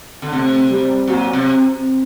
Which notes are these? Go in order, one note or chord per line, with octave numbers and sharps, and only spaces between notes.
D3
C3 A3
G3
A#2 F#3
C3